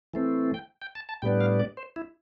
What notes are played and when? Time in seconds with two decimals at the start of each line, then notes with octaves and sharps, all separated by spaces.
0.14 E3 A3 C4
0.54 G5
0.82 G5
0.95 A5
1.09 A5
1.22 A2 G3 B3 D4 G5
1.41 F5
1.59 D5
1.77 C5
1.96 E4